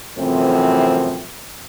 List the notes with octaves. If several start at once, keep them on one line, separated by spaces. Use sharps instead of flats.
F#2 A2 C3 E3 F3 C4